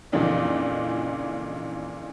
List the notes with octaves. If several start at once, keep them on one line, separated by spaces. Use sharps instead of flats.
F2 A#2 C#3 E3 D4 D#4